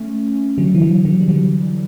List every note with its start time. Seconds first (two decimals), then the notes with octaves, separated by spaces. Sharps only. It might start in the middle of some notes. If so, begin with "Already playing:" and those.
Already playing: A3 C#4
0.58 D3 F#3
0.75 E3
0.82 D3 F#3
1.05 D3 F#3
1.20 G3
1.29 D3 F#3